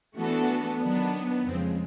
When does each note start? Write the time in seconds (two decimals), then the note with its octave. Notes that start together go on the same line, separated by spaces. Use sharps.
0.15 E3 A3 B3 D4 F#4 A4
0.81 D#3 F#3 B3 D4
1.45 F2 C#3 F3 G#3 C4